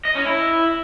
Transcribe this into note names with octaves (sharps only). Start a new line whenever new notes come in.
D#5
C#4
E4